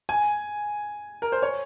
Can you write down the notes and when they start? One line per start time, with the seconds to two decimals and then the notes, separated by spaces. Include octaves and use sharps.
0.09 G#5
1.22 A#4
1.32 C5
1.42 C#5